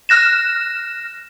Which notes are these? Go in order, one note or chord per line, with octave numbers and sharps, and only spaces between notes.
F6 F#6 A#6 E7